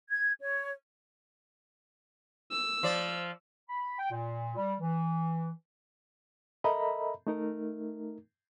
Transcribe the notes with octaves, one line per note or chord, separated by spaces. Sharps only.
G#6
C#5
E6
F3 D5
B5
G5
A#2
G3
E3
A4 A#4 D#5 E5 A#5 B5
A3 D#4 A#4